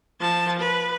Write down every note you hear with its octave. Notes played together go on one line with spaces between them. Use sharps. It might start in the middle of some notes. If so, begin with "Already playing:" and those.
F3 A5
B4